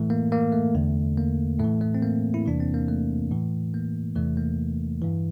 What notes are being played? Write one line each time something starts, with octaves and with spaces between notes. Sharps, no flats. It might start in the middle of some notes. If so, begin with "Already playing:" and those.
Already playing: A2 E3 A3
A#3
A#3
A3
E2 D3
A#3
A2 E3 A3
A3
C4
A#3
E4
E2 C3 E3 D4
C4
A#3
A3
A2 E3
A#3
E2 C3 E3 A3
A#3
G2 E3